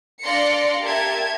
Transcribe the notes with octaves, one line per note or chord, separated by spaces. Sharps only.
D4 D5 F5 C6 A#6 C#7
G4 A#4 E5 A5 G#6